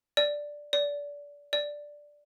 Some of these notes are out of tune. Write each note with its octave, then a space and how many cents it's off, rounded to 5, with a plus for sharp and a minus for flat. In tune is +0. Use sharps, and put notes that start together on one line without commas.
D5 +0
D5 -25
D5 +0